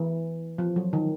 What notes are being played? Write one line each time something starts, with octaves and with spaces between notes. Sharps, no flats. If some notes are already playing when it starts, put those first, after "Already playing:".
Already playing: E3
F3
F#3
D#3